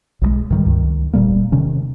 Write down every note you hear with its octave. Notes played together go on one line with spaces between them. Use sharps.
B1 E3 G#3
G2 D#3 G3
C#2 D#3
E1 A#2 G3 A#3
C3 D#3 C#4